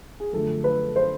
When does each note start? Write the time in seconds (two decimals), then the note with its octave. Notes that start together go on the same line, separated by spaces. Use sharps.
0.20 G#4
0.33 F#2 D3 F3 A3 A4
0.64 B4
0.96 C5